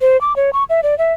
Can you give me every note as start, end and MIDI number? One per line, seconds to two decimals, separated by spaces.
0.01 0.20 72
0.21 0.36 86
0.36 0.50 73
0.53 0.64 85
0.70 0.81 76
0.83 0.97 74
0.98 1.13 76